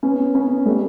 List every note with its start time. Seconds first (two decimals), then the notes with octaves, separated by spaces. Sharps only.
0.03 B3 C#4
0.34 B3 C#4
0.66 G3 A3